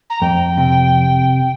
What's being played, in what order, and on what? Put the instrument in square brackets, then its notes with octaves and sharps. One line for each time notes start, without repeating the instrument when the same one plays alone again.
[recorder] A#5
[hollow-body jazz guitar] F2 [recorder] G5
[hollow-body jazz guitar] C3